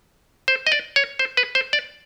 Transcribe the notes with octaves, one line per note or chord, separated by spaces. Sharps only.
C5
D#5
D5
C#5
C5
B4
C5
D5